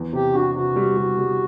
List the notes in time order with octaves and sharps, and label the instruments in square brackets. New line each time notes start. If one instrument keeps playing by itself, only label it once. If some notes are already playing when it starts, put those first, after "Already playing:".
Already playing: [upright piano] E2
[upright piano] C3 [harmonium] G4
[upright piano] D4 [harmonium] F#4
[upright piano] C3 [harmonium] F#4
[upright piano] G3
G3
G3